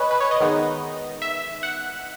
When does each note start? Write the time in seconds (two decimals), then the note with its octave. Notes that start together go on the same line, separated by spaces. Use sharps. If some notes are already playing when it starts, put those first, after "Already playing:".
Already playing: B4 C#5 D#5 G#5
0.11 B4
0.20 C#5
0.31 D#5
0.40 D#3 G#3 B3 D#4
1.22 E5
1.63 F#5